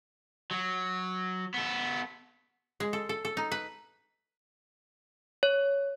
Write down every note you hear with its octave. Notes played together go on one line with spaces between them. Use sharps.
F#3
B3 A4
G#3
A4
A4
A4
D#4
B4
C#5